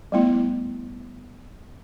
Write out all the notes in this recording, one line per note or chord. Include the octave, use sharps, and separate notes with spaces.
G3 A3 B3 E4